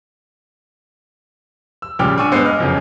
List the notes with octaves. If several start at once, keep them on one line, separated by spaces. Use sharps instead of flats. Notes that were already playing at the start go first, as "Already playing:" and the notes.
E6
A#1 C#3 G3 G5 D6 F6
D4 G#5 C#6 E6 D#7
G2 G#3 B3 C5 C7
D#5 G#5 D6 F6
F#1 F2 C#3 C#4